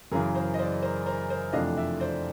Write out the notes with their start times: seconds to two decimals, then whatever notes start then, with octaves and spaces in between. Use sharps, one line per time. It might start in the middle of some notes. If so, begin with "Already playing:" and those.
0.12 F#2 C#3 E3 G#4 A#4
0.35 A#4 C5
0.54 D#5
0.59 C5 D5
0.83 A#4 C5
1.06 A#4 C5
1.30 A#4 C5
1.53 F2 C3 E3 A3 D4 D#5 F5
1.77 D5 E5
2.00 C5 D5